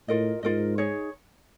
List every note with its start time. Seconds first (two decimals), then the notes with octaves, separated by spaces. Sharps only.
0.08 A2 F4 A#4 D#5
0.43 G#2 F4 A#4 D#5
0.78 D#4 G#4 C#5